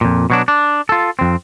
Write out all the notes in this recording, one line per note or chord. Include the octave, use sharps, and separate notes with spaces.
F2 A#2
B2 F#3 D4
D4
F4 A4
F2 C4